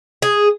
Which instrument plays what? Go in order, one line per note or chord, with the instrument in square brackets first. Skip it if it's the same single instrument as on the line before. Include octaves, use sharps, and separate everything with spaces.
[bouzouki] G#4